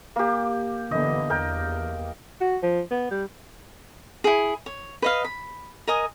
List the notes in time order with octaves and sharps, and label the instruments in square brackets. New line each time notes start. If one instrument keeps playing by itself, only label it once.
[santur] A#3 G4
[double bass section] D3 E3 B3 [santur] D#5
[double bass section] E2 [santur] A#4 G5
[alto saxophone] F#4
F3
B3
G3
[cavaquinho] E4 G#4
C#5
B4 D#5 F5
B5
A#4 D#5 G#5 D#6